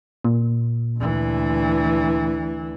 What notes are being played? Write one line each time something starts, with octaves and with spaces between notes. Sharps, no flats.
A#2
D2 E3